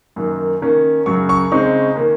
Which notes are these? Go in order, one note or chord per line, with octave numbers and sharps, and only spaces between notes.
F#2 D#3 A#3
D#3 A#3 C#4
F#2 C#3 F#3 C#6
C#6
C#3 G#3 C4 D#4 C#6
D#3 A#3 C#4